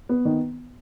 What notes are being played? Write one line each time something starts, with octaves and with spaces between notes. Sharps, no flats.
B3
D#3